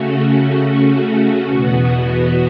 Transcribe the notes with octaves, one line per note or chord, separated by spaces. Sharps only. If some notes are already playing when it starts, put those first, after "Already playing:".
Already playing: C#3 A3 C#4 F#4
E2 B2 B3 F#4